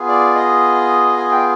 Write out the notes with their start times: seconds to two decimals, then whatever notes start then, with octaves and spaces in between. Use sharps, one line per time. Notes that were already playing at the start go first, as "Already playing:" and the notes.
Already playing: B3 F4 G#4
0.08 D5
0.35 D#5
1.18 G#5
1.32 G5